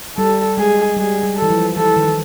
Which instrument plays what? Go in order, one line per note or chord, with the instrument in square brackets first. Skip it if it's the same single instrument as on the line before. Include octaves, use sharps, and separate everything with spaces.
[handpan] G3 [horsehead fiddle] A4
[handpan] G#3 [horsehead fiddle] G#4
[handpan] G3 [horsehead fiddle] G#4
[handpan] G3
[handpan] E3 [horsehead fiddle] A4
[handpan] F3
[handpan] E3 [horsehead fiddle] A4
[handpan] D#3